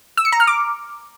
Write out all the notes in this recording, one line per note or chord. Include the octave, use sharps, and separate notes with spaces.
E6
C#7
A#5
F6
D6